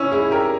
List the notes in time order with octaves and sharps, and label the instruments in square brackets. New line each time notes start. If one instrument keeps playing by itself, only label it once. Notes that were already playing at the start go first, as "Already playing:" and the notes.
Already playing: [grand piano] C#4 E4
E4 G#4
G4 A#4